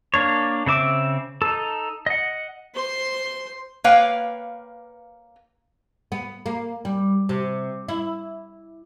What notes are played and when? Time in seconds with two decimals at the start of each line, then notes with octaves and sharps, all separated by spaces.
0.14 A#3 D4 C#5
0.66 C#3 C4 E5 D6
1.42 D#4 A4
2.06 D#5 F#5
2.74 C5 C6
3.84 A#3 B4 C#5 F5 G5
6.12 B3
6.46 A#3
6.85 G3
7.29 C3
7.88 E4